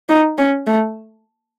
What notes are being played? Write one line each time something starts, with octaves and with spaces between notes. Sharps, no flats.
D#4
C#4
A3